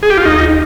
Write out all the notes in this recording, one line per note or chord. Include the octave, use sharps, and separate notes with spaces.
G#4
G4
F4
D#2 D#4